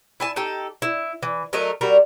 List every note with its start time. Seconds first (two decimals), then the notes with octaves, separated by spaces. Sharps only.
0.20 E4 G#5 A5
0.36 D#4 G4 A4 A5
0.82 E4
1.23 E3
1.53 F#3 A3 A#4 D#5
1.81 G3 F#4 A#4